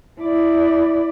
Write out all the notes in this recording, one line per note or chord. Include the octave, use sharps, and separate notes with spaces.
E4 D5